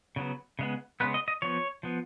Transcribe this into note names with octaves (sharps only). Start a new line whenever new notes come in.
C#3 F#3 B3
C#3 G#3 B3
C#3 G#3 B3 B4
D#5
D#5
F3 B3 C#5
F3 B3